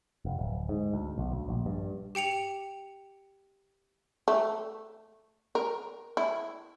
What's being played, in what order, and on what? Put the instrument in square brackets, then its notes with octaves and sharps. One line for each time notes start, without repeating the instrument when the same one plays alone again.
[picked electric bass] F1
D1
G#2
D2
B1
D2
A#1
G2
[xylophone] G4 G5 C#7 F7
[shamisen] A3
A#4
E4